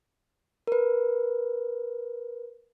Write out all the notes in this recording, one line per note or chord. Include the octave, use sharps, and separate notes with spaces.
A#4 B4